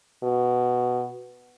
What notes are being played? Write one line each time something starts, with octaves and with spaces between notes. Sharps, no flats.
B2